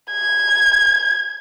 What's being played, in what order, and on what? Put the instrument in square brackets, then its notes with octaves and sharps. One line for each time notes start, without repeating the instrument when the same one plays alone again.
[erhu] G#6